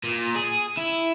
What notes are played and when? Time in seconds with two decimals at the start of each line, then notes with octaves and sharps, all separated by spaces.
0.04 A#2
0.35 G#4
0.77 E4